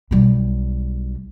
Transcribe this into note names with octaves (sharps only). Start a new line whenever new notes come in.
B1 G3